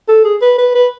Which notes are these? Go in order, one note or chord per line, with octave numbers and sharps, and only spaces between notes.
A4
G#4
B4
B4
B4